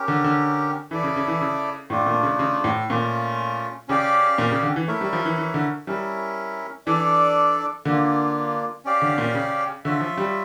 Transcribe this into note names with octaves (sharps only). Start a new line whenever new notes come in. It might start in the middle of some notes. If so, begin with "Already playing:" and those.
Already playing: C#4 G4 A#4
D3
D3
E3 E4 A4 D5
C#3
C#3
E3
C#3
A2 A3 D4 F4
A#2
C#3
C#3
A2
A#2 A3 C#4 F4
C#3 C#4 G4 D5 F5
A#2
C#3
D3
E3
A3 E4 A#4 C#5
G3
F3
E3
E3
D3
G3 C#4 E4 A#4
E3 D4 A4 D5
D3 A#3 D4 F4
C#4 G4 D5 F5
D3
A#2
C#3
D3 F4 C#5 E5
F3
G3